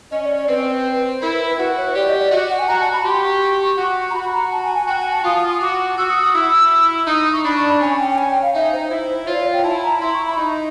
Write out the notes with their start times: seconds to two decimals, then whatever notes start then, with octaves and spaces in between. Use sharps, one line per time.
0.11 C#4 D#5
0.24 D5
0.36 D5
0.48 C4 B4
1.21 E4 A#4
1.33 B4
1.46 B4
1.58 F#4 B4
1.77 C#5
1.95 G4 D5
2.08 D#5
2.20 D5
2.31 F#4 D#5
2.50 F#5
2.59 G#5
2.68 F#4 A#5
2.80 A5
2.93 B5
3.05 G4 C6
3.23 C#6
3.78 F#4
4.10 A#5
4.14 F#4 B5
4.33 A#5
4.51 A5
4.64 G#5
4.76 G#5
4.88 F#4 G5
5.00 G#5
5.12 A5
5.24 F4 D#6
5.37 D#6
5.49 D#6
5.61 F#4 D6
5.98 F#4 E6
6.10 D#6
6.22 D#6
6.35 E4 E6
7.07 D#4 D#6
7.20 D#6
7.33 C#6
7.44 D4 B5
7.57 C#6
7.69 B5
7.81 C#4 G#5
7.99 G5
8.10 G5
8.18 G#5
8.30 G5
8.42 F5
8.55 D#4 E5
8.73 C5
8.90 E4
9.27 F4 C#5
9.34 D5
9.40 C#5
9.53 G5
9.64 E4 A5
9.83 A#5
10.01 E4 C6
10.13 C#6
10.25 B5
10.38 D#4